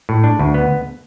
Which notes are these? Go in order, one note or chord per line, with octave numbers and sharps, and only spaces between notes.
A2
D4
D2
B3